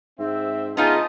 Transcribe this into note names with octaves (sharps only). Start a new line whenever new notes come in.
G#2 C4 E5
C#3 B3 D#4 F4 D#5 G#5 A5